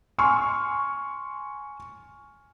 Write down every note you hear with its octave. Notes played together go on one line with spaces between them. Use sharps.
G#5 C6 C#6 F6